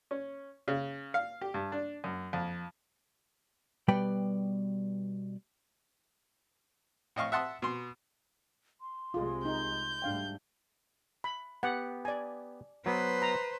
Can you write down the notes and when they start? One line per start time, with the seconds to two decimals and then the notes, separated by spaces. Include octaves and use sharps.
0.11 C#4
0.68 C#3
1.14 F5
1.41 G4
1.54 G2
1.72 D4
2.04 F#2
2.33 F2
3.88 B2 G3 B4 D5 G5
7.16 A2 D#5 F5 C#6
7.32 E5 F#5 A5 C6 D#6
7.62 B2 C6
8.81 C6
9.14 C2 C3 G#3 F4 G#4
9.45 D#4 G6
10.02 G#2 G3 A3 D4 F5 G5
11.24 B5
11.63 B3 G4 F#5
12.05 D5 G#5
12.86 F#3 B3 B4 C5
13.22 A#5